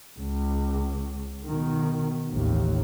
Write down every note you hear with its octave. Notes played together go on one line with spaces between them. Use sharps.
C#2
B2 D#3
A1 D#2